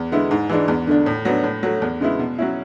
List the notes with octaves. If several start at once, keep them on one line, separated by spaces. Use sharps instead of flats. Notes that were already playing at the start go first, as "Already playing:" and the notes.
Already playing: E2
D3 G#3 B3 E4
G#2
E3 G#3 D4
E2
D3 A3 D4
A2
F#3 B3 D4
A2
F#3 A3
E2
C#3 G#3 B3 E4
B2
F#3 C#4 E4